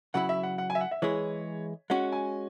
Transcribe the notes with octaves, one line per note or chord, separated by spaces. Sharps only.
C#3 F#3 E4 F#5
E5
F#5
F#5
G#5
E5
F#5
E5
E3 G#3 E4 G#4 C#5
G#3 C#4 F#4 F#5
G#5